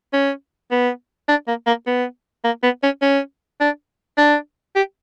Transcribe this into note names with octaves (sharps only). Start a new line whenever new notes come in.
C#4
B3
D4
A#3
A#3
B3
A#3
B3
C#4
C#4
D4
D4
G4